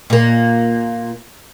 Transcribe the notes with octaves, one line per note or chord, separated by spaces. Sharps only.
A#2 A#3